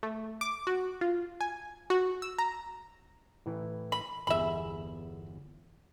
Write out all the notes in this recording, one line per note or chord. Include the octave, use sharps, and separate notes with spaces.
A3
D6
F#4
F4
G#5
F#4
E6
A#5
A2 E3
B5
G1 E2 G#4 E5 B5